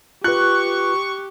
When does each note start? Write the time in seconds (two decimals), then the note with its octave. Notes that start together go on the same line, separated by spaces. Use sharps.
0.24 F4 G4 B4 C#6 F#6